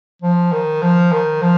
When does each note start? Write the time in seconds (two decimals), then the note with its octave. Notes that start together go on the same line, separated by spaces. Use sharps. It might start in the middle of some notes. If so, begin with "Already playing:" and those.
0.22 F3
0.53 D#3
0.83 F3
1.12 D#3
1.42 F3